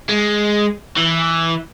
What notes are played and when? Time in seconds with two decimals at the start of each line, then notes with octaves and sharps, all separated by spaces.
0.09 G#3
0.98 E3